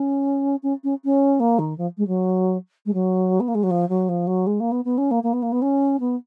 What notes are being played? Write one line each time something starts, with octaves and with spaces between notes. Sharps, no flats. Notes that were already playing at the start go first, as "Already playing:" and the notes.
Already playing: C#4
C#4
C#4
C#4
A#3
D#3
F3
G#3
F#3
G#3
F#3
B3
A#3
G#3
F#3
F3
F#3
F3
F#3
G#3
A#3
B3
B3
C#4
A#3
A#3
B3
A#3
B3
C#4
B3